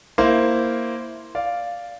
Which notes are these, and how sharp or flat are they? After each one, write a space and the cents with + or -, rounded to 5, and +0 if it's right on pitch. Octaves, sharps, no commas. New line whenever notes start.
A#3 +0 E4 +0 C5 +0
D5 -5 F5 +0